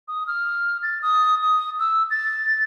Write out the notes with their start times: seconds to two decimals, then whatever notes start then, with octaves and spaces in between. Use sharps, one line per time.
0.08 D#6
0.27 F6
0.83 A6
1.02 D#6
1.43 D#6
1.79 E6
2.11 A6